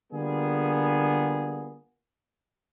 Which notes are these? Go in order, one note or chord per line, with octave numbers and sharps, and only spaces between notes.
D3 G3 A#3 B3 F4 G#4